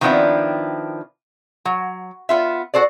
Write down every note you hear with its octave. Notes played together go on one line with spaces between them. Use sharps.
D#3 F3 B3 C4 D4 E4
F#3
B3 F4 E5
F#4 A4 C5 D5